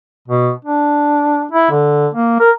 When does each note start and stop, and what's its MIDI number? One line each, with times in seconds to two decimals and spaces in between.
0.28 0.51 47
0.65 1.43 62
1.52 1.69 64
1.71 2.08 50
2.14 2.38 58
2.40 2.51 70